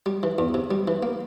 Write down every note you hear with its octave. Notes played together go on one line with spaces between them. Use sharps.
G3
E3
E2
C3
G3
E3
A#3